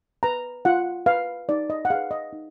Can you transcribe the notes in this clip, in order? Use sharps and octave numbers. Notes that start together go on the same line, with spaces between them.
B4 A#5
F4 F#5
B4 F5
D#4 D5
D#5
F#5
G#4 B4 F5
D#5
D#4